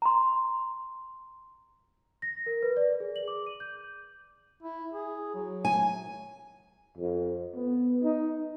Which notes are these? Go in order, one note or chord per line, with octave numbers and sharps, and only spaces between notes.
A#5 C6
A#6
A#4
B4
D5
G#4
F#7
D6
D#7
G6
E4
G#4
F#3
G#5
F2
B3
D#4